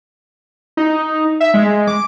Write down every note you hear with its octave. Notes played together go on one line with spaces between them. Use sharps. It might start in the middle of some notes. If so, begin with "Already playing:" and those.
D#4
E5
G#3
D6